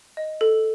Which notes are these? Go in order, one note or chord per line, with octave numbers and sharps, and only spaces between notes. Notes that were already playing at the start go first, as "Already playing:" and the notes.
D#5
A4